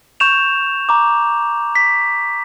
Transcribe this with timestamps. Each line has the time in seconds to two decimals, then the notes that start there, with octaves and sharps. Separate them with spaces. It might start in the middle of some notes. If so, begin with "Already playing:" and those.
0.20 C#6 G6 E7 F7
0.89 A#5 D6
1.75 B6